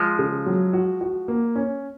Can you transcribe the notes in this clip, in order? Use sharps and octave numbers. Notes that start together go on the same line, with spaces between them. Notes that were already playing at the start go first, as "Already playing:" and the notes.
Already playing: F3 G#3
C#3
F#3
F#4
F#4
A#3
C#4